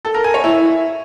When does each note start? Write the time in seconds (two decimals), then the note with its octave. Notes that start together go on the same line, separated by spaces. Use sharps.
0.05 A4
0.14 A#4
0.24 G#5
0.34 C#5
0.44 E4